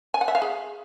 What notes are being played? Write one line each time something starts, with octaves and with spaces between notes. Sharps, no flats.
G#5
F#5
E5
F5
G#4